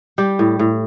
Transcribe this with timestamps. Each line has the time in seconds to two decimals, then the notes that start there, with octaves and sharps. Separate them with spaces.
0.18 G3 G4
0.39 A2
0.59 A2